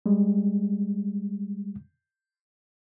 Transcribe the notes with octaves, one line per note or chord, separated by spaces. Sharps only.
G3 G#3